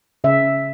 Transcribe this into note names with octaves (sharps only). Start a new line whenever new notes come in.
C#3 E5